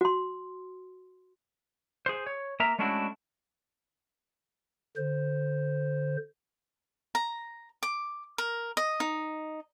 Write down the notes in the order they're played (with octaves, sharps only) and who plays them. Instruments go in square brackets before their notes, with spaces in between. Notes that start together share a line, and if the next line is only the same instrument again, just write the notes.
[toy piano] F#4 C6
[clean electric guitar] G#4 C5
C#5
A#3 A#4 E5 A#5
G#3 A3 C#4 D4 E4 F#4
[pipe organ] D3 C5
[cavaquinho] A#5
D6
A#4
D#5
D#4